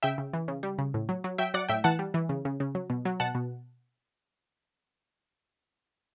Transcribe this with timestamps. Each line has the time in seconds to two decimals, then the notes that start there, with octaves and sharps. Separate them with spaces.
0.03 C#3 E5 G5
0.18 C#3
0.33 E3
0.48 C#3
0.63 G3
0.79 C#3
0.94 A2
1.09 F#3
1.24 F#3
1.38 F#3 E5 G5
1.54 F#3 D5 F#5
1.69 A2 E5 G5
1.84 E3 F#5 A5
1.99 G3
2.14 E3
2.29 C#3
2.45 C#3
2.60 C#3
2.75 F#3
2.90 B2
3.05 F#3
3.20 B2 F#5 A5
3.35 B2